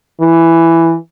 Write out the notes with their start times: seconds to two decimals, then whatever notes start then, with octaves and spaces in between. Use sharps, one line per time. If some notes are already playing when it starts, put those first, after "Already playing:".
0.21 E3